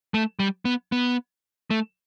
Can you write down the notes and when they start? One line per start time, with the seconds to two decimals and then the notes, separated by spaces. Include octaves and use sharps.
0.14 A3
0.39 G3
0.65 B3
0.92 B3
1.71 A3